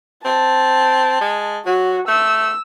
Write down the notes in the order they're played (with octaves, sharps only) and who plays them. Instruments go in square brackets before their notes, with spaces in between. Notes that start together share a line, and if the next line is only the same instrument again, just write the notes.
[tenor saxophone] C4 [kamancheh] A5
[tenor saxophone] G#3
[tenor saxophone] F#3 [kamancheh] F#4
[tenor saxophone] A3 [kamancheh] E6